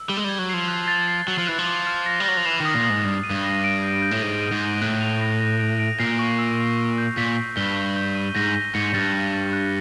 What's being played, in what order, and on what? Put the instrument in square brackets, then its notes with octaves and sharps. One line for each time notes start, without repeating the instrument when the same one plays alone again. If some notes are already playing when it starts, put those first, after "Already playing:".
Already playing: [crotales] E6
[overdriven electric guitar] G3 [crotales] G7
[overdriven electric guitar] G#3
[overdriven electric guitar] G3 [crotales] G#6
[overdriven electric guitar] F#3
[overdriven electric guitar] F3 [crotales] C7
[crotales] F#6
A6
C7
[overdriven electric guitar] F#3 [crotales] F#6
[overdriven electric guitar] F3
[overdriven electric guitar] E3 [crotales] F#6
[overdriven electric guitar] F3
[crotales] D6
F6
A#6
[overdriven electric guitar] G3
[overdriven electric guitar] F#3 [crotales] A#6
[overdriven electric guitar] F3
[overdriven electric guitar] E3 [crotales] C7
[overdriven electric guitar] D#3
[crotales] D#6
[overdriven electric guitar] A#2
[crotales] D#6
[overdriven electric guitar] G#2
[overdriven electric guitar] G2 [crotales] A#6
[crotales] D#7
[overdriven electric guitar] G2
[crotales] A#6
D7
G6
G6
[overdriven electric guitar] A2
[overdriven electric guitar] G#2 [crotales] D#7
[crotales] D#7
[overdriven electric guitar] G#2
[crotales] F#6
[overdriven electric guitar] A2 [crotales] F#6
[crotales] F7
A#6
A#6
D7
D7
[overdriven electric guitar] A#2 [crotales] C7
[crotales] C#6
E6
E6
E6
G6
[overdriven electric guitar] A#2 [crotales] B6
[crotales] B6
[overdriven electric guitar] G2 [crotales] G7
[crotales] G6
G6
D#7
[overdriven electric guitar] G#2 [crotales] A#6
[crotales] A#6
[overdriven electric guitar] G#2 [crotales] C#7
[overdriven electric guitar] G2 [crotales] A6
[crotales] F6
A6
F#6